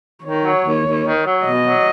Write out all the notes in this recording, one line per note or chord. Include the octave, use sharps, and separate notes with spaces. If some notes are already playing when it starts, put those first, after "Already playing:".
D#3 C#5
F#3
D#2
D#2
D#3
F#3
B2 D#5
F#3